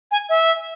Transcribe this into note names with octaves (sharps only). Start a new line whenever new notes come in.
G#5
E5